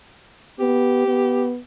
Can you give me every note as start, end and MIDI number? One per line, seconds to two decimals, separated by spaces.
0.60 1.06 59
0.60 1.49 67
1.08 1.59 59